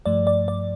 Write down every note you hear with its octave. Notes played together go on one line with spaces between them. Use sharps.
G2 F3 A3 D5
D5
D5